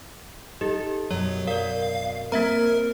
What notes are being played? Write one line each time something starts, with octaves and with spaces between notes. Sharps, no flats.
D#4 G4 A4
F#2 B2 F#3 C#5
A#4 D5 F5
A#3 C4 A#4 E5 A#5